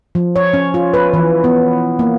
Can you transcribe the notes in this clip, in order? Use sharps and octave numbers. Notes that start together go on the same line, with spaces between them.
F3
C#5
C#4
F4
B4
E3
B3
A#3